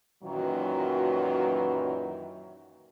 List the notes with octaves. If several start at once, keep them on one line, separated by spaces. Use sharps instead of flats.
F#2 A#2 D#3 E3 F#3